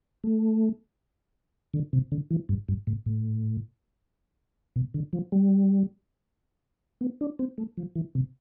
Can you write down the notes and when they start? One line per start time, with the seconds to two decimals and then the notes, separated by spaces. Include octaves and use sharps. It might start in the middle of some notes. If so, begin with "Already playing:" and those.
0.24 A3
1.74 D3
1.93 C3
2.12 D3
2.31 E3
2.49 G2
2.69 G2
2.87 A2
3.06 A2
4.76 B2
4.94 D3
5.13 F3
5.32 G3
7.01 B3
7.21 D4
7.39 C4
7.58 A3
7.77 F3
7.95 E3
8.15 C3